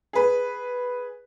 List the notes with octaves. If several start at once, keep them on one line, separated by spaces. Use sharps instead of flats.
G#4 B4